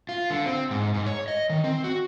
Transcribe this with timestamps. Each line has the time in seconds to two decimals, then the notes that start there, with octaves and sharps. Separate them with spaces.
0.09 F4
0.30 D3
0.46 C4
0.71 G#2
0.94 G#2
1.07 C#5
1.28 D#5
1.50 D#3
1.64 C4
1.84 F#4